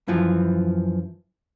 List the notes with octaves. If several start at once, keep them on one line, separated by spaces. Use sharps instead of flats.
F#2 E3 F3